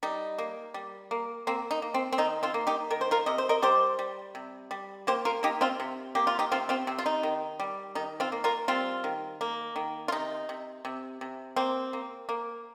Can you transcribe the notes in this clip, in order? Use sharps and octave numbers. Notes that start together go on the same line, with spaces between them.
G3 D#4
A#3
G3
A#3
A#3 C4
D#4
A#3
C4
C4
D#3 D#4
C4 F4
A#3
D#4 G4
D#3 A#4
C5
F4 A#4
C3 D#5
C5
A#4 D#5
G3 G4 C5
G3
C3
G3
A#3 G4 C5
F4 A#4
A#3 D#4 G4
C4 F4
C3
A#3 G4
F4
D#4 G4
C3 C4 F4
C4 F4
C3 C4
F4
D#4
D#3
G3
D#3 D#4
C4 F4
A#3
F4 A#4
G3 C4 F4
D#3
A#3
D#3
F4
C3 D#4
C3
C3
C3
A#3 C4
A#3
A#3